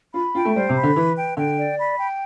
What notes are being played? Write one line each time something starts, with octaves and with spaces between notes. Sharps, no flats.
F4 B5
F4 G5
A3
G3 C5
C3
B5
D3
E3 B4
G5
D3 G5
D5
B5
G5